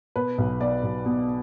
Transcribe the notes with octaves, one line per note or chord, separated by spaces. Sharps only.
B2 B4
B1
B2 D5
B1
B2